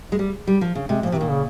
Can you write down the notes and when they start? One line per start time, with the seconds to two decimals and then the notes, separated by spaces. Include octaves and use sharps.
0.12 G#3
0.19 G3
0.47 G3
0.61 F3
0.75 C#3
0.89 C3 G#3
1.03 A#2 F3
1.12 C3
1.17 A#2 D#3
1.29 C#3